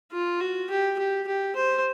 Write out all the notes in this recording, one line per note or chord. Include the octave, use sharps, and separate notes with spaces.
F4
F#4
G4
G4
G4
C5